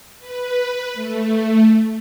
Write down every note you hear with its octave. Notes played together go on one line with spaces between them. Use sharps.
B4
A3